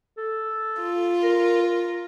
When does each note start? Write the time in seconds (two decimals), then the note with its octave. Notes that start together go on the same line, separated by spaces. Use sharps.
0.17 A4
0.81 F4
1.23 A#4
1.62 A#4